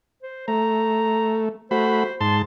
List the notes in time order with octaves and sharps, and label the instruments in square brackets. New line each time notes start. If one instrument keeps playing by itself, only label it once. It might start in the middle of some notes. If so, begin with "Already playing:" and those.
[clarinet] C5
[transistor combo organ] A3 [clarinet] A#5
[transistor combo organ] A3 F#4 B5 [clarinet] C5
[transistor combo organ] G#2 A5 [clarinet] C6